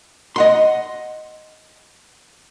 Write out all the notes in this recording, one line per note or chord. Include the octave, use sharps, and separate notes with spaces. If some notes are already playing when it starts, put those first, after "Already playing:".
D#5 F#5 C6